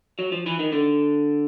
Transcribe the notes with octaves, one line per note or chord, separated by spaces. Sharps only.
F#3
F3
E3
D#3
D3